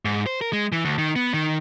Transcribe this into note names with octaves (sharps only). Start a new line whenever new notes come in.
G#2
C5
A#4
G#3
E3
D2
D#3
B3
D#3